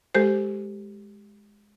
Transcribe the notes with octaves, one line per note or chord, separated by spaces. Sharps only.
G#3 G4 A4 C5